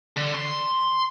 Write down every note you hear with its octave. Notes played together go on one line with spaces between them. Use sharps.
D3
C6